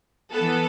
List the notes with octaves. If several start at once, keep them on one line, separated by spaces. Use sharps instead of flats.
E3 B3 A4